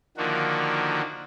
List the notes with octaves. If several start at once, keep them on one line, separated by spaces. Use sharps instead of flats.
D3 D#3 F3 A#3 F#4